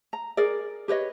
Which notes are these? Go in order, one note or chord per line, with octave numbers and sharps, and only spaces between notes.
A#5
G#4 A#4 D5
G4 B4 C#5 D#5